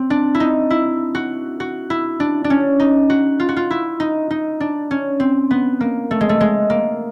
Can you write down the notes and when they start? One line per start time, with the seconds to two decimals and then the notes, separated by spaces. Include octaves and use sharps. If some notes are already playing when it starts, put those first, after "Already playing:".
Already playing: C4
0.10 D4
0.35 E4
0.40 D#4
0.70 E4
1.15 F#4
1.60 F#4
1.90 E4
2.20 D4
2.44 D4
2.50 C#4
2.80 D#4
3.10 F#4
3.40 F4
3.49 F#4
3.56 F4
3.70 E4
4.00 D#4
4.31 D#4
4.60 D4
4.91 C#4
5.20 C4
5.51 B3
5.80 A#3
6.11 A3
6.21 G#3
6.29 A3
6.41 G#3
6.70 A#3